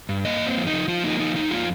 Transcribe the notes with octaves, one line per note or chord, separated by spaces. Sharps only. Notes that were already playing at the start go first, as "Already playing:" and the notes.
G2
A#3 D#5
F2 C4
F3
D#4
F3
F3 F4
A#3 D#4
F3 D#4
F2 D#4
A#3 F4